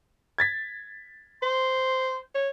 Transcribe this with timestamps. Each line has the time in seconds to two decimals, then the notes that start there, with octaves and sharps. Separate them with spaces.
0.38 G#6 A6 B6
1.42 C5 C6
2.35 C#5